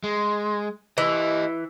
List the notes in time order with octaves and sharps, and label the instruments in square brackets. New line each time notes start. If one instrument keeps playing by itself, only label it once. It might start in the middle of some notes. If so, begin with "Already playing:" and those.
[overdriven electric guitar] G#3
[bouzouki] E3 [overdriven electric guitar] G4 D#5